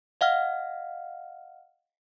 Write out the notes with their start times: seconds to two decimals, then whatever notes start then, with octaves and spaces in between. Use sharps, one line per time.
0.21 D#5 F5 F#5 F6